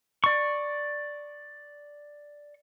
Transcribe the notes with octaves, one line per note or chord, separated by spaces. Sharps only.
D5 C#6